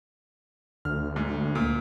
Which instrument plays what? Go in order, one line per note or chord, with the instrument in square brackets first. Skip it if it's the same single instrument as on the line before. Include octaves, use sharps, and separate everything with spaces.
[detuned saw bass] D2 [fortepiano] F6
[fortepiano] G#2
A#2